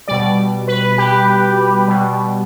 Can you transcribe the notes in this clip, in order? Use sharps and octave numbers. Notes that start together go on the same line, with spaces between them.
B2 G3 D5
B4
G4
B2 G3